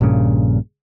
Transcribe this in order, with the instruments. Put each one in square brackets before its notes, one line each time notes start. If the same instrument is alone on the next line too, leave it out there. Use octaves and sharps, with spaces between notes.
[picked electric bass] A#1 G2 A#2 C#3